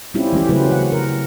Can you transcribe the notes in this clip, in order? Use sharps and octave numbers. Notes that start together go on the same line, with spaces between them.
G3 C4 C#4 E4 F4 G4
E3 A3 C#4 G4
C#3 F#3 C#4 G4 B4 C5
F#5
A#4